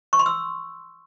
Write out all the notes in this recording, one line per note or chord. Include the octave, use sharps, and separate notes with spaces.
C#6
C6
E6